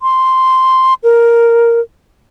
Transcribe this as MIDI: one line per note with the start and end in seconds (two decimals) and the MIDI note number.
0.01 0.94 84
1.03 1.80 70